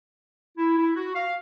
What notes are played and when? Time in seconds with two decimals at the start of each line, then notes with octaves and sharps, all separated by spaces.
0.58 E4
0.78 E4
0.95 F#4
1.15 F5